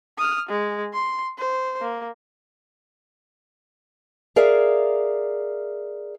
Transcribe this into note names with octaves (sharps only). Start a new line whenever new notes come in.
D#6 F6
G#3
C6
C5
A#3
G#4 A#4 D5 E5 F5